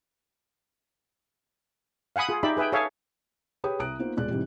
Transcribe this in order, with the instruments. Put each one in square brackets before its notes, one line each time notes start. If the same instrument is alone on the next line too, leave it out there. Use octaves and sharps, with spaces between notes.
[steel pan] F5 F#5 G#5 B5 D#6
F4 G#4
D#4 G4 D5 E5 B5
G#4 B4 E5 G5
G#4 A4 C#5 E5 F5
[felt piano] G4 G#4 B4 C#5 G5 D#6
C2 A#5 D#6 F#6 D7
A#3 B3 D#4 F4 C5
D#1 B2 G#3 F4 D5 F#6
G#2 C3 E3 G3